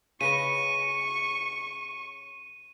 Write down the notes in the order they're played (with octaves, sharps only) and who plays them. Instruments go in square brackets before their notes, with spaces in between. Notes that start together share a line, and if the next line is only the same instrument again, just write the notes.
[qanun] C#3 B4 D#5 [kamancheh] C#6 [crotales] D#7